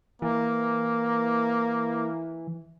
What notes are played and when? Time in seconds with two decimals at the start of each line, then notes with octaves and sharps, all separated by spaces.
0.22 E3 A#3